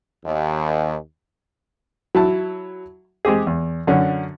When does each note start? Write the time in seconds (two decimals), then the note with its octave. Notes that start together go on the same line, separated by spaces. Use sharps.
0.25 D#2
2.15 F#3 E4 A5
3.25 G#3 C4 G4 G#4
3.47 E2
3.87 F#2 D3 C#4